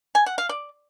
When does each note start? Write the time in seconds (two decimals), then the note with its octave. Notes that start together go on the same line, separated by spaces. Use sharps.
0.15 G#5
0.26 F#5
0.38 F5
0.49 D5